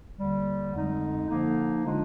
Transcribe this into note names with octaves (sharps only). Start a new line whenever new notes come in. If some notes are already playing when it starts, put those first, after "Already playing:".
D#2 D3 G3
F2 D3 G#3 D#4
D3 F3 A#3 D#4
D3 G#3 D4 F4